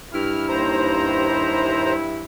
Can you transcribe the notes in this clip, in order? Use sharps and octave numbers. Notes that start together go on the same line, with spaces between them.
G2 E4 F6
D#2 C5 A#5